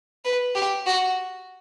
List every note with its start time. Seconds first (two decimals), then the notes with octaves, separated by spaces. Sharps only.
0.25 B4
0.55 G4
0.86 F#4